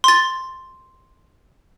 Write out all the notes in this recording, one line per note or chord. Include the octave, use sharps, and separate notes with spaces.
C6 A6